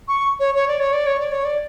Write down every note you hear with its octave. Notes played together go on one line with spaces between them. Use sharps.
C#6
C#5
C#5
D5
C#5
D5
C#5
D5
C#5
D5